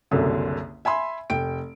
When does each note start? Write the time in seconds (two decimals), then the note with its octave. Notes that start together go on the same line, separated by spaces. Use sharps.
0.11 F#1 C2 F#2 D3
0.85 E5 G#5 B5 C6
1.30 F1 G5 D7